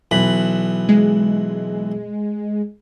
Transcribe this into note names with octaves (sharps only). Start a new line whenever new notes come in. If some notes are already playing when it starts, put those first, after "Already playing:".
B1 E3 B5
G#3